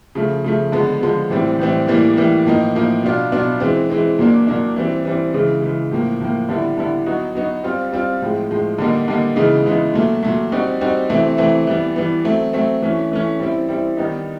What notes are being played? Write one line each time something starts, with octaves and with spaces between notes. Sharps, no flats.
C#3 F3 A3
C#3 F3 A3
D3 F3 G#3 B3
D3 F3 G#3 B3
A2 E3 G3 C4
A2 E3 G3 C4
A2 E3 G3 A#3
A2 E3 G3 A#3
A2 F3 A#3 D#4
A2 F3 A#3 D#4
B2 F#3 B3 D4 F4
B2 F#3 B3 D4 F4
E3 G#3 C4
E3 G#3 C4
A#2 F#3 A#3 D4
A#2 F#3 A#3 D4
E3 G3 C4
E3 G3 C4
C#3 E3 G#3
C#3 E3 G#3
A2 F3 A#3
A2 F3 A#3
D3 G3 B3 E4
D3 G3 B3 E4
F#3 B3 D#4 F#4
F#3 B3 D#4 F#4
G3 C4 F4
G3 C4 F4
A2 F3 G#3
A2 F3 G#3
D3 G3 A#3 D#4
D3 G3 A#3 D#4
C#3 E3 G#3 B3 D#4
C#3 E3 G#3 B3 D#4
A#2 F#3 A3
A#2 F#3 A3
G3 C4 D#4 F#4
G3 C4 D#4 F#4
C3 E3 A3 C4
C3 E3 A3 C4
E3 G3 B3
E3 G3 B3
F#3 A3 C4
F#3 A3 C4
E3 A3 C#4
E3 A3 C#4
G3 C4 E4
G3 C4 E4
D#3 G3 B3 D#4